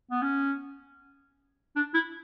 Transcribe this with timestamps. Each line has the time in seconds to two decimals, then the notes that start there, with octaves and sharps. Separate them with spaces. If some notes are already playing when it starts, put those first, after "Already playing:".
0.11 B3
0.22 C#4
1.76 D4
1.94 E4